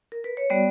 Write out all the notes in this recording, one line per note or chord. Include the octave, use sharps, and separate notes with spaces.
A#4
B4
C#5
G3 B3 F#4 D5